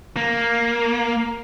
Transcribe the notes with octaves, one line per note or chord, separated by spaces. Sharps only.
A#3